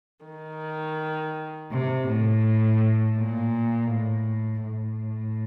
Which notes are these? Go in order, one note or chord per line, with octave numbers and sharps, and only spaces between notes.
D#3
C3
A2
A#2
A2
A2